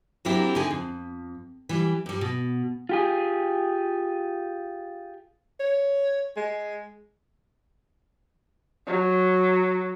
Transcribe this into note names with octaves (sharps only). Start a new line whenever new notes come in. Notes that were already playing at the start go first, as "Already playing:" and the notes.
F#3 A#3 C4 D4 E4 G4
D3 D#4 G#4 G#5
F2
E3 G3
G2 G3
B2
F4 G4 G#4
C#5
G#3
F#3